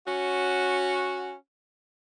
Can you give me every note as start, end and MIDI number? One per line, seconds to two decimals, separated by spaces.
0.07 1.34 61
0.07 1.34 66